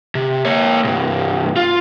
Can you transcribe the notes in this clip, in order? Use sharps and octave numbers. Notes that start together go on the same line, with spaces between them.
C3
A#3 C#5
C2 G2
F4